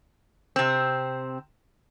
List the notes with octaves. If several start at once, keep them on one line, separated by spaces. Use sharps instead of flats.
C3 C4